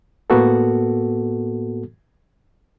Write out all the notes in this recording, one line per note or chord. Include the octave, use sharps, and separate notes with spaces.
A2 A#3 B3 F#4 A4